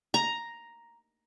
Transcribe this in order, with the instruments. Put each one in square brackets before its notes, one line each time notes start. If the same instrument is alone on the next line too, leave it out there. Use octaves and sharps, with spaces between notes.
[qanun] A#5